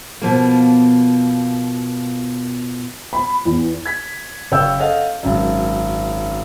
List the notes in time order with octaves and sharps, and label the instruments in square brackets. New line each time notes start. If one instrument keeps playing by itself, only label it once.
[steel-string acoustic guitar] B2 F3 A#3
[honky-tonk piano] B5
E2
[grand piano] G#6 B6
F#1 C#5 F5 G5 E6 G6
A4 C#5 D#5 F5 F#5
G#1 F#2